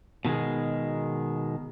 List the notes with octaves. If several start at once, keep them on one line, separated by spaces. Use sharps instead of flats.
B2 D#3 F#3 G#3